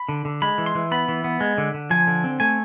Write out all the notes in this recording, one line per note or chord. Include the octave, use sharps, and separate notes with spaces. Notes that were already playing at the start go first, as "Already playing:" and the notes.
Already playing: B5
D3
D3
G#3 B5
E3
C6
E3
B3 B5
E3
B3
G#3
D3
D3
F3 G#5
D3
C4
A3 G#5